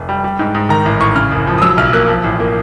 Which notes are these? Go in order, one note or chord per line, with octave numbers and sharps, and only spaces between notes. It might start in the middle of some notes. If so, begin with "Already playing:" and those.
Already playing: F1
G3
G3
G#2
G#2
D#3 A#5
A1
A1 C#6
C#3 F6
F#1
F3
D#6
F#3 E6
B1 F6
A#3 F#6
F3
A1
A#3